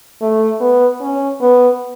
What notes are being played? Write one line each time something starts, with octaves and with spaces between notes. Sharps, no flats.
A3
B3
C#4
B3